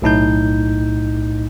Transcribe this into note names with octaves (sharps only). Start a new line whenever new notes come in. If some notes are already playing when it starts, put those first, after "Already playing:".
B1 A2 D#4 G6